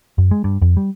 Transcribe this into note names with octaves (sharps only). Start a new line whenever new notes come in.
F#2
G#3
G2
F2
G3